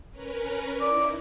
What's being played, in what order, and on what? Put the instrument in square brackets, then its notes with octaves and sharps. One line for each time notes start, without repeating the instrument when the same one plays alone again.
[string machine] C#4 A#4 B4
[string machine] D#4 E4 [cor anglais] D5